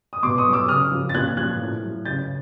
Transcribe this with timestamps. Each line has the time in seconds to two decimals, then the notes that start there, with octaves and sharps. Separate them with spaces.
0.13 D#6
0.23 B2 C6 D6
0.38 C#6 D#6
0.46 F#3
0.53 D6 E6
0.68 C#3 D#6 F6
0.92 F3
1.09 A6
1.14 A#2 F#6 G#6
1.37 F3 F#6 G#6
1.60 A2
1.82 F#3
2.05 C#3 G6 A6